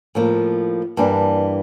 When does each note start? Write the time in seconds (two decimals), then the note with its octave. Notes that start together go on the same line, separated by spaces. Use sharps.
0.15 A2 F3 A#3
0.97 G2 E3 A#3 D4